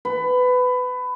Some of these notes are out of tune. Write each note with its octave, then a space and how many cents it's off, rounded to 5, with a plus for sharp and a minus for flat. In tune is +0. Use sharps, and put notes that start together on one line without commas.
B4 +20